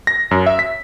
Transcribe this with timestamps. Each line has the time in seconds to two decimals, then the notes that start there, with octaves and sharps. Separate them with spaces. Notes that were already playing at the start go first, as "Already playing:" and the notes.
0.07 A#6
0.31 F#2
0.46 E5
0.59 B6